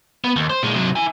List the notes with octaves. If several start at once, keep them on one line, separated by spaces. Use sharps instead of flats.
B3
D#2
C5
A#2 G#3
C3 F#3
E4 G#5